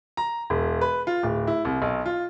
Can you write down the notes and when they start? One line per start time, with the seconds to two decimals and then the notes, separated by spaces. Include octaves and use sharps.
0.17 A#5
0.50 E1
0.81 B4
1.07 F4
1.23 D1
1.47 E4
1.65 C2
1.82 B1
2.06 F4